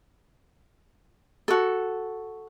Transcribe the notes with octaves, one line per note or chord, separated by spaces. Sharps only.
F#4 A4